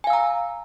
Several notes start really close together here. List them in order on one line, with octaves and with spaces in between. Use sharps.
G#5 F5 E6 A#5